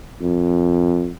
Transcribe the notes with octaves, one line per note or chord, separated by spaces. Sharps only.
F2